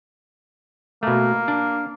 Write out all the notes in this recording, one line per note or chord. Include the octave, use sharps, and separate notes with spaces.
B2 A3 A#3
D4